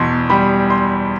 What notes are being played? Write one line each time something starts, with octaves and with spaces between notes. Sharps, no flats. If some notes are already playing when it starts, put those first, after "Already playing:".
Already playing: E2 B2 C6
G3 B5
C6